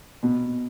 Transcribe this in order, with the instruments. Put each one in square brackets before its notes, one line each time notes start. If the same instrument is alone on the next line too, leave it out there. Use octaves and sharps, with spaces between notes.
[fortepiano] B2